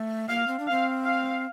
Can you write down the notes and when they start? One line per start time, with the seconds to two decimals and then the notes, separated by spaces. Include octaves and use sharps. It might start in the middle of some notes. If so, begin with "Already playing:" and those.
Already playing: A3
0.28 A#3 F5
0.47 C4
0.59 D4
0.67 C4 F5
1.04 F5